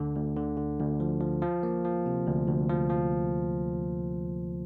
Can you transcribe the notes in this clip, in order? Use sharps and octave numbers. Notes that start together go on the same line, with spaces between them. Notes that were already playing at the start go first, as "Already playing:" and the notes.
Already playing: D2 D3
D2
D3
D3
D2
F3
F3
F3
A#3
F3
C3
D2
D2
F3
F3